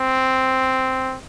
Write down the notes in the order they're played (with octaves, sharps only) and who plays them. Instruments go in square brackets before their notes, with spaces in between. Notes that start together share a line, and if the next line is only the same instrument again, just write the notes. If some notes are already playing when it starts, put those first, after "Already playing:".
Already playing: [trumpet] C4